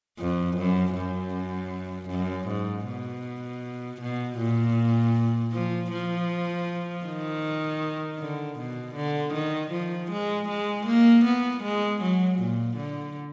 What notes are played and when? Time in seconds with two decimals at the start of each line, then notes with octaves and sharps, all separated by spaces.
0.19 F2
0.57 F#2
0.96 F#2
2.09 F#2
2.48 G#2
2.86 B2
4.01 B2
4.38 A#2
5.53 F3
5.91 F3
7.06 D#3
8.19 D3
8.58 B2
8.95 D3
9.34 D#3
9.72 F3
10.11 G#3
10.49 G#3
10.86 A#3
11.25 B3
11.63 G#3
12.02 F#3
12.39 A#2
12.77 D3